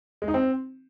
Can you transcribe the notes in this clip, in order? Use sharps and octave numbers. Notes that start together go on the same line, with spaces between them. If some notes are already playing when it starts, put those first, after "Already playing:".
G#3
D#4
C4